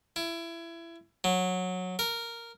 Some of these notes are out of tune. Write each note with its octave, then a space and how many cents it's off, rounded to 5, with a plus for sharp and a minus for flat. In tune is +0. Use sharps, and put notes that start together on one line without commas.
E4 +25
F#3 -15
A#4 -5